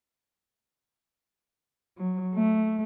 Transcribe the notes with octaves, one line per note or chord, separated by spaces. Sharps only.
F#3
A3